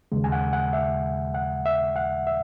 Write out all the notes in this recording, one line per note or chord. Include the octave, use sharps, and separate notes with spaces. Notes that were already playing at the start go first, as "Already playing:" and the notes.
D#2 C#3 G#3
G#5
F#5
F#5
E5
F#5
E5
F#5
E5